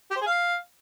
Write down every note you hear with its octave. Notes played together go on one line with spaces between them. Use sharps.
G4
C5
G#4
F5